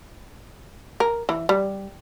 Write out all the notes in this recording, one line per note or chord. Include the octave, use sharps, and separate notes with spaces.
A#4
E3
G3